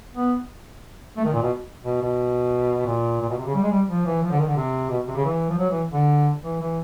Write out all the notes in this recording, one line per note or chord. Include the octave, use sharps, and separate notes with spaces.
B3
A3
D#3
A#2
B2
B2
B2
A#2
A#2
B2
C3
C#3
G3
G#3
G3
F3
E3
F3
D3
D#3
D3
C3
B2
C3
C#3
E3
F3
F#3
E3
D3
E3
E3